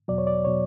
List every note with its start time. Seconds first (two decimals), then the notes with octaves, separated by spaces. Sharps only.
0.08 E2 B2 F#3 D5
0.18 C#5
0.27 D5
0.45 B2 F#3 C#5